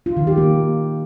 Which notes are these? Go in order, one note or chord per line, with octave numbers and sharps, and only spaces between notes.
F4
D#3
G4
A#3